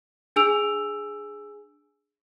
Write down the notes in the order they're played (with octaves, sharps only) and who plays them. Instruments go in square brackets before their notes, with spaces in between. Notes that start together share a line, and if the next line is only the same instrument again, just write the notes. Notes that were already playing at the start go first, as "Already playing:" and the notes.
[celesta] D4 G#4 G#5 E6 D7 F7